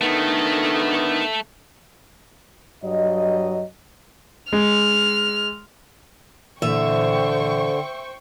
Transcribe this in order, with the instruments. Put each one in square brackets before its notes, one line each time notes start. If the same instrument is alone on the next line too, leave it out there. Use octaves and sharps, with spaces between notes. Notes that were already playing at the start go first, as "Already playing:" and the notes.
[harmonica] D3 D#3 B3 [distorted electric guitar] A3
[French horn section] G2 F#3 D#5
[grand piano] G#3 [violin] F6
[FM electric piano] A#2 E3 [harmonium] D3 [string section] C5 G5 C#6 [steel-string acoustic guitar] E5